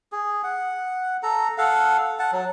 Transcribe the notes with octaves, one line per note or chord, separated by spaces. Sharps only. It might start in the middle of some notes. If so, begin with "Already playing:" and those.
G#4
F#5
A4 A#5
A4 F5 F#5
F#5 A5
F#3